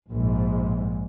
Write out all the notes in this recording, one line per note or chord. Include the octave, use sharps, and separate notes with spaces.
A#1 G#2